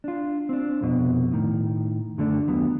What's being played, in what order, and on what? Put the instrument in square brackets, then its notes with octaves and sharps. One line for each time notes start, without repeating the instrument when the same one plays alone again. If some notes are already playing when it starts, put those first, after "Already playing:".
[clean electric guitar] D4 F4
C4 D4
C2 F2 B2
A2 D#3
F#2 D3 A3 D4
D#2 F#3 B3